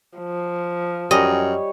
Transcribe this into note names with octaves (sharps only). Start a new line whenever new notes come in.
F3
F#2 G3 C#5 D#5 G#5